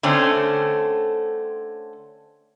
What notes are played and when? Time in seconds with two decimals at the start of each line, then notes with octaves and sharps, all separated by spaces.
0.03 D3 A3 C4 C#4